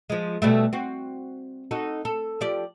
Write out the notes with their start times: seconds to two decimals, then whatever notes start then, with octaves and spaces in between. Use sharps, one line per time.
0.10 F3 G#3
0.42 B2 G3 A3
0.73 C4 F#4
1.71 D#4 F#4 A4
2.05 A4
2.41 F3 G4 D5